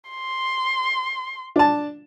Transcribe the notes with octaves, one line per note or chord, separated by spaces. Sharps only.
C6
D4 A5